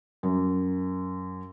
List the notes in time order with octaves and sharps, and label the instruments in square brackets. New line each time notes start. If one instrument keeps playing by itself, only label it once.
[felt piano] F#2